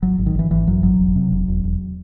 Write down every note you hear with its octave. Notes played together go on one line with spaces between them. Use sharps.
G#1 F#3
G#1
D#3
G#1 E3
G#1 E3
F#2 F#3
G#1 F#3
E1
C3
E1
E1
E1